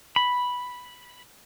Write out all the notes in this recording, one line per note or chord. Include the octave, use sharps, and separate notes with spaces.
B5